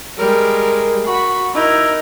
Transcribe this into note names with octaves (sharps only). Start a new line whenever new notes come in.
G3 G#3 A#4
F#4 B5 C#6
D#4 E4 A#4